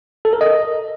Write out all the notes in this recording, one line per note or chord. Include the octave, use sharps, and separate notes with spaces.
A4
A#4
D#5